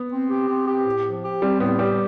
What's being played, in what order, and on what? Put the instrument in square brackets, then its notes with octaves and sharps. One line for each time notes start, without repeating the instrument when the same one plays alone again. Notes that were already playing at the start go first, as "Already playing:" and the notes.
Already playing: [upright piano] B3
[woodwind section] C4
G4
C4
G4
A2
F3
G4
[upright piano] G3 [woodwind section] C4
[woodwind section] A2 [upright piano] B3
[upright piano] G3 [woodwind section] G4